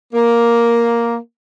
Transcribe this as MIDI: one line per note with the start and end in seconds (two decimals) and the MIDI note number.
0.14 1.17 58